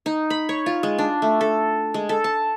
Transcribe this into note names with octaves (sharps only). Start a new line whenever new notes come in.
D#4
B5
C#5
F4
G#3
D4
A3
A4
G#3
A4
A5